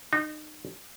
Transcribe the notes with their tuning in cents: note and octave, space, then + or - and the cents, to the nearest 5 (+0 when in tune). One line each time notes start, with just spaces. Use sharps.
D#4 -30